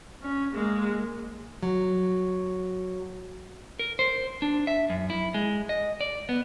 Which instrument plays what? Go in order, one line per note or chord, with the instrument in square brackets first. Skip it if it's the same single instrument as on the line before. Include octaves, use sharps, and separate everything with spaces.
[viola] C#4
G#3 A#3
[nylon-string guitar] F#3
[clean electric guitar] A#4
C5
D4
E5
F#2
E4
G#3
D#5
D5
B3